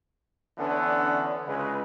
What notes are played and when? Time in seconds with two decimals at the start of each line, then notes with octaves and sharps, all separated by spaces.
0.58 D3 E3 B3 C#4 D4 A4
1.47 C#2 G#3 B4